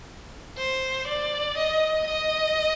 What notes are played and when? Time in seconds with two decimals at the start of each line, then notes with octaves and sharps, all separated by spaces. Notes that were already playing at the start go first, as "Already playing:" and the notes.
0.58 C5
1.07 D5
1.57 D#5
2.07 D#5